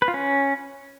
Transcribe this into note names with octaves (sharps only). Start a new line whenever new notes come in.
B4
F4
C#4